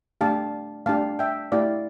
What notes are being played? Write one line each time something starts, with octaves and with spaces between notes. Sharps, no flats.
A3 D4 G4 F5 A5
A3 D4 G4 F5 A5
E5 G5
A3 E4 G4 D5 F5